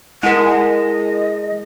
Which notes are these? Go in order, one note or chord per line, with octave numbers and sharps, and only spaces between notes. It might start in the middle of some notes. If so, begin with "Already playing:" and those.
G#3 E4 A#4 F#5
D#5